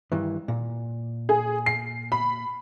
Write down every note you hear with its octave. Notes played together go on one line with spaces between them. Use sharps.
G2 D#3 E3
A#2
G#4
C7
B5